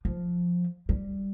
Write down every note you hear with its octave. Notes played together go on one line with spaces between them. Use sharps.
F3
G3